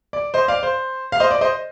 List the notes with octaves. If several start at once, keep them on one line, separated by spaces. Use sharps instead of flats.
D5
C5 D#5
D5 F5
C5
F5
C5 D#5
D5
C5 D#5